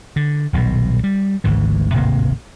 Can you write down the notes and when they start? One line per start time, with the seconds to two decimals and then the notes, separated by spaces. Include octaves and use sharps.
0.16 D3
0.53 D#1 B1 B2
1.04 G3
1.44 G#1 D2 G#2 E3
1.93 D1 G#1 C3 A#3